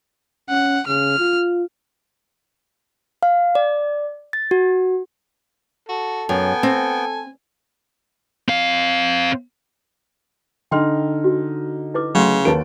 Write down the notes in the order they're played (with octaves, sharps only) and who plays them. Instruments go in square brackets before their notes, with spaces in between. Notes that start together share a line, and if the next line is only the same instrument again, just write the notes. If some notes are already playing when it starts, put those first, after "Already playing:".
[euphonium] C#4 [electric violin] F#5
[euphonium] C#3 [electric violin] F6
[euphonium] F4
[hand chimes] F5
D5
A6
F#4
[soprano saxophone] F#4 [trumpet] A4
[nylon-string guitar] F#2 [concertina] B3 G5 [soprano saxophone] G#5
[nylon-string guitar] C4
[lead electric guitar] C4 F5
[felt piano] D3 D#4 F6 [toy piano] G5 C6
[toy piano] F#4
E4 B4 D6
[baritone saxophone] C#3 [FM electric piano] F#3 A3 [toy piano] F#5 C6
[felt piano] D#2 D7 [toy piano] D#4 C#5 C#6 [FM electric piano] A#4 B4 A5